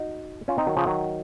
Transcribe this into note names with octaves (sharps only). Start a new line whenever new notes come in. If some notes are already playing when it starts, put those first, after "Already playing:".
Already playing: D#4 F#4
C#4 F4
C4 D#4
D#3 F#3
C#3 F3
D#3 F#3